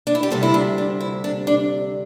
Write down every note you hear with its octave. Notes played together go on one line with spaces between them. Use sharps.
D4
E4
G4
D2 C3 G3 C4 A4
E4
D4
D4
E4
D4
D4